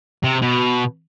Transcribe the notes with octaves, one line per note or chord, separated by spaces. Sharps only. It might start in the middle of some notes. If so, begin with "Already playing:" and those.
C3
B2